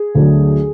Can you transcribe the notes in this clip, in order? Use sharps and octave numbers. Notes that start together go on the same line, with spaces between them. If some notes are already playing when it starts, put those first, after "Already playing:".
Already playing: G#4
D2 D3 F#3